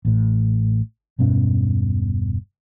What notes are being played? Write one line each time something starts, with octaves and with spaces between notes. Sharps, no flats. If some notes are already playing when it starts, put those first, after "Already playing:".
A1 A2
E1 G2 B2 C#4